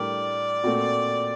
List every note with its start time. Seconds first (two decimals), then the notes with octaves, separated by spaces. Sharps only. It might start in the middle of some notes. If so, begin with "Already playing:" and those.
Already playing: A2 G3 D4 G4 A#4 D5
0.64 A#2 A3 C4 F#4